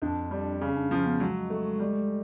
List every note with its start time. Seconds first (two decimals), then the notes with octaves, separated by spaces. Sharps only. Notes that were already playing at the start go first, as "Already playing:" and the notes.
0.02 F2 D4
0.31 G3
0.61 C#3 C#4
0.76 D4
0.91 F3 C#4
1.06 B3
1.20 F#3 G#3
1.50 A3
1.80 G3